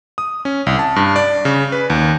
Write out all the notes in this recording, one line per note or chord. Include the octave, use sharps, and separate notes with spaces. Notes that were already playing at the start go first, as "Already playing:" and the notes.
D#6
C#4
C2
A5
G2
D5
C#3
B4
D#2